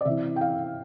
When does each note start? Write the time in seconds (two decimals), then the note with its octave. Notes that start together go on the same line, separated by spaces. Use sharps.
0.01 D5
0.05 C3 E3 E5
0.36 G5
0.41 F5